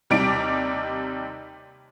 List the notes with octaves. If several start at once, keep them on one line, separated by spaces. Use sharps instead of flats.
D#2 C3 G3 D#4 D6 D7